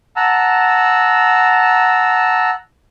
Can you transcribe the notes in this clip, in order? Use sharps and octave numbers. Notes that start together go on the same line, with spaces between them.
F#5 A5 A#5 E6